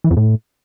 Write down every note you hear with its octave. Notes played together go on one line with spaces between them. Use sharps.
E3
F2
A2